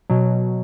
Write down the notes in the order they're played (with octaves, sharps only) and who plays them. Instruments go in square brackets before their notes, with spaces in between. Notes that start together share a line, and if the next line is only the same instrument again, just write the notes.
[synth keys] B2 F#3